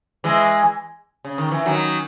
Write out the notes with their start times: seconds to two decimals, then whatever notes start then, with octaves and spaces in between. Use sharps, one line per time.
0.24 E3 G#3
1.24 C#3
1.38 D#3
1.51 E3
1.65 D#3 F#3